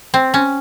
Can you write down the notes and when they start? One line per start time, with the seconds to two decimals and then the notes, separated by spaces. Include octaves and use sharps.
0.14 C4
0.34 C#4